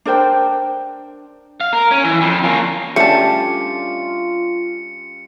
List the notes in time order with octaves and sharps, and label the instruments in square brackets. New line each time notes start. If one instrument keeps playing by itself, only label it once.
[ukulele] D4 A#4 C5 G5
[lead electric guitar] F5
A#4
C#4
E3
F2
A#3 C#4
[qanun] G3 C#4 D4 [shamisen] A3 A5 [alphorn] F4 [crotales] C#7